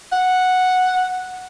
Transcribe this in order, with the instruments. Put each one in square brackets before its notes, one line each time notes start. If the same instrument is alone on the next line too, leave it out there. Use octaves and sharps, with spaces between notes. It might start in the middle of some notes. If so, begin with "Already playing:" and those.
[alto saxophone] F#5